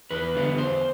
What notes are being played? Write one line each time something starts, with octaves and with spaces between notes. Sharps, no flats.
E2 B4
D3 G3 B3
E2 C5